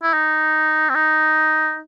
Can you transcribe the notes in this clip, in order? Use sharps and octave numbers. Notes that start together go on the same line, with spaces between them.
E4
D#4
C4
D#4